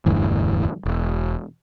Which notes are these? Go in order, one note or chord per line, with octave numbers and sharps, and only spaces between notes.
E1 D2 G2 E3
E1